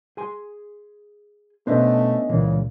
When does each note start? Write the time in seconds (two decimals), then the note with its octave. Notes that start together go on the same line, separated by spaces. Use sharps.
0.17 G#4 G#5 C6
1.67 B2 A3 B3 C#4 D4 C5 D#5 E5
2.29 C#2 A#2 C#3 E3 G#3